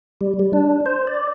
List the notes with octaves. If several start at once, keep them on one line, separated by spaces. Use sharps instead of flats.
G3
G3
D4
C5
D5